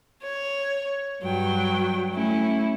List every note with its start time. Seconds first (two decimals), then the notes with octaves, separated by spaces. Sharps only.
0.22 C#5
1.23 G2 F#3 G5
2.13 A3 C#4 E4